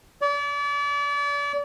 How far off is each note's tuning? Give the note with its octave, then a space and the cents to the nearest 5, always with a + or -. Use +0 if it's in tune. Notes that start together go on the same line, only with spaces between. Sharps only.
D5 -35